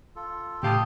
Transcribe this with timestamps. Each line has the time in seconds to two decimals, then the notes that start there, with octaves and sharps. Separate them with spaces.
0.16 F4 A4
0.63 A2 C#3 G4 F5 A5 D#6